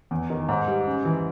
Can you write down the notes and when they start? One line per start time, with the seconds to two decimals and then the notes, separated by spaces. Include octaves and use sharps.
0.11 E2
0.30 D#3
0.49 G#2
0.67 G3
0.86 C#3
1.05 E3